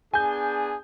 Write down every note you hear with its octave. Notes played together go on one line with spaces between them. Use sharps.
B3 D4 G#4 G#5 G6